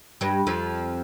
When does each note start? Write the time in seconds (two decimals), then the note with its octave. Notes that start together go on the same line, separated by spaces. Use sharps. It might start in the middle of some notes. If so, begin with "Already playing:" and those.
0.21 G2 G3
0.47 F2 F3